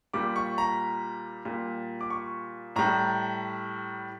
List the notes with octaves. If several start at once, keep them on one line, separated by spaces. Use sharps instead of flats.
A#2 G3 D6
C#6
A#5
A#2 G3
D6
C#6
A2 G3 A#5